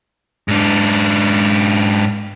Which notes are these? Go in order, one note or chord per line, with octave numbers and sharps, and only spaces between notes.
G#2 D4